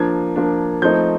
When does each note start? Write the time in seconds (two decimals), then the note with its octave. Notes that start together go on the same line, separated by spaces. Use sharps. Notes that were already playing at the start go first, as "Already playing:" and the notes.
Already playing: F3 A#3 D4 G#6
0.36 F3 A#3 D4
0.82 F3 A3 C4 D#4 G6